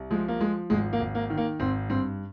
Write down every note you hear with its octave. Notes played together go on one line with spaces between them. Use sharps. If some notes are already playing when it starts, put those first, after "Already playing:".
Already playing: C2
F3 G#3
A#3
F3 G#3
G#1 G#3
A#3
G#1
A#3
D#3
A#3
G#1 C4
G2 C4